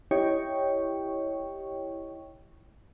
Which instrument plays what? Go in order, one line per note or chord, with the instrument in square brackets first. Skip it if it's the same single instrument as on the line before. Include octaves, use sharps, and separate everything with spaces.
[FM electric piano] E4 G4 C#5 D#5 G5 C#6